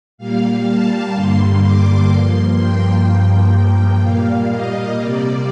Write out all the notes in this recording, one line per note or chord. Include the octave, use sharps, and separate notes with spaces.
A#2 G3 A#3 F5
A5
G2 D3 G3 A#3 C6
D6
G2 F3 A#3 C6
G5
G2 F3 A#3
A#2 G3 A#3 F5
D#5
C3 G3 A#3 D5